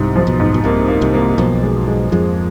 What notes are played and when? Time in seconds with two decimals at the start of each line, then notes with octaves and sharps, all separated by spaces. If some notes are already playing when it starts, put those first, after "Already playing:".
Already playing: C2 G#2 C3
0.16 F3
0.27 B1 B2
0.40 G#2
0.54 B2
0.64 C2 C3 A#3
0.88 A#3
1.01 C2 C3
1.14 A#3
1.38 B1 B2 F3
1.63 G#3
1.88 G#3
2.12 F2 F3 G#3